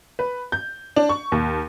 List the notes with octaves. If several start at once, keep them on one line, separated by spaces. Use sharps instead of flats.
B4
G6
D4
C#6
D#2